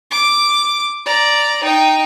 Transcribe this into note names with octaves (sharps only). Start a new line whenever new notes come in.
D6
D5 A#5
D#4 G5